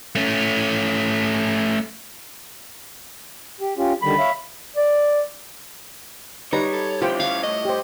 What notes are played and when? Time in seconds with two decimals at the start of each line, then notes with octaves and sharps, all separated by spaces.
0.15 A3 C#4
3.61 G4
3.78 C#4 F4 G4
4.02 D3 D#3 G3 B5
4.19 C#5 E5 F5
4.77 D5
6.53 G3 D#4 B4 C#5 A#5
6.73 A4
7.02 C#4 E4 F4 G4 C5 G5
7.20 C#5 F5
7.43 A2 D#5
7.65 G4 C5